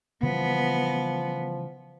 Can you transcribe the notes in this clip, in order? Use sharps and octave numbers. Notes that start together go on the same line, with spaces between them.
C#3 E3 F3 G3 B3